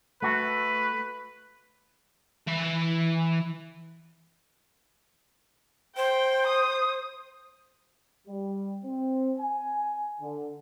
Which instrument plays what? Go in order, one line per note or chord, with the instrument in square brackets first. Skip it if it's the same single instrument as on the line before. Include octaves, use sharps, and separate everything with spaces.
[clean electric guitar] A3 F#4 [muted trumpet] B4
[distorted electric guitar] E3 B5
[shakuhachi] C5 [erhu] G5
[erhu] D#6
[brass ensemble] G3
C4
G#5
D3